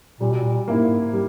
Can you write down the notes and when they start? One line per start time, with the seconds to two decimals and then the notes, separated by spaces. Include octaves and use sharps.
0.21 A#2 G3
0.32 B2
0.43 A#2
0.68 G#2 A#3 E4
1.13 G3